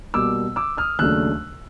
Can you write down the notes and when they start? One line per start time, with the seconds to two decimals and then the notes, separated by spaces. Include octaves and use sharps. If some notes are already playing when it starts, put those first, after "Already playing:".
0.14 B2 G3 A#3 D6 E6
0.56 D6 E6
0.77 D#6 F6
0.98 D#2 C#3 F#3 A3 D4 E6 F#6